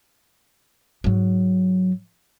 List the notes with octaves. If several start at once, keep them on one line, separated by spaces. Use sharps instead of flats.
G#2 F#3